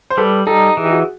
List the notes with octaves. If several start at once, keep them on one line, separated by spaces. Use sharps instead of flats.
C5
G3 A4 B4
D#4 G4 A4
E3 G#4
G4
F#4 G#4